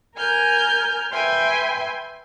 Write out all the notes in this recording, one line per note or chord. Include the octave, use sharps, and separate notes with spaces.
A#4 G#5 F6 G6
B4 E5 G5 G#5 C6